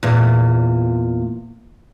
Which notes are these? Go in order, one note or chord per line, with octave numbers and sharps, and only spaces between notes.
E2 A#2